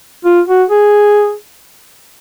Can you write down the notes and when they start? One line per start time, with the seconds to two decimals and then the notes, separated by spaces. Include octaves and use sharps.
0.25 F4
0.48 F#4
0.70 G#4